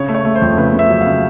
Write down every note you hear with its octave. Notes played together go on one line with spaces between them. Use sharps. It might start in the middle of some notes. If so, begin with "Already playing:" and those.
Already playing: C#3 C#5
A3
C#5
A3
C5
F2
C#3 B4
C#3
E5
F#3
F5
C#3